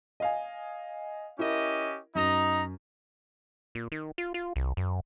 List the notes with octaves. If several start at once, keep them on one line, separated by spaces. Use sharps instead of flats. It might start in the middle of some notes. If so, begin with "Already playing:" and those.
D#5 F5 G#5
C#4 E4 G4 A#4 D#5
F#2 D#4 D#5 A#5
A#2
D#3
F4
F4
C2
F#2